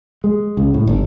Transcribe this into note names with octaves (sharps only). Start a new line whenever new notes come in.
G#3
C#2
A2
G1